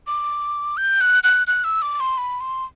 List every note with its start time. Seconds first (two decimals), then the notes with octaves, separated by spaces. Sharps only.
0.07 D6
0.77 G6
1.01 F#6
1.24 F#6
1.47 F#6
1.64 E6
1.82 D6
2.00 C6
2.18 B5
2.41 C6